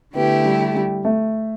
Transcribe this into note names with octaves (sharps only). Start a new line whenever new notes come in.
D3 A3 B3 E4 G4
G3
G3
A3